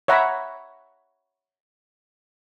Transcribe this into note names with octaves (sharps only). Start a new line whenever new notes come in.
C#5 E5 F#5 A#5 B5